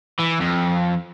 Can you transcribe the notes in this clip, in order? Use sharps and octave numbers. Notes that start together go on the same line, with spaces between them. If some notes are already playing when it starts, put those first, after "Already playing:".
E3
F2